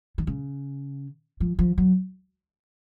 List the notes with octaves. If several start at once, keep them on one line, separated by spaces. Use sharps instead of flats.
D#3
C#3
F3
F3
F#3